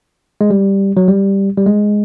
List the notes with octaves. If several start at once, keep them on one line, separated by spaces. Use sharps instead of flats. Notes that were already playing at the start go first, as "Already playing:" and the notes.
G#3
G3
F#3
G3
G3
G#3